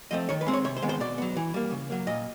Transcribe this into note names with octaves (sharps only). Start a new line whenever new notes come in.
F3 A3 C4 D#5
D#3 C#5
B4
G#3 C4
C#5
C3 C#5
C5
D#3 G#3 B3
C5
B2 D5
F#3 B3
E3
G3 A#3
C#3
F#3 A#3
A#2 D#5